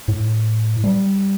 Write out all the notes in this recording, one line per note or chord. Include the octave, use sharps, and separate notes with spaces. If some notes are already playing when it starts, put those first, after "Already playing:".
A2
G3